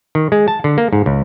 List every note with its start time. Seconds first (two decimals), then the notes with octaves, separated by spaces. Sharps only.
0.15 D#3
0.32 G#3
0.48 A5
0.64 D3
0.78 A#3
0.93 G#2
1.06 C#2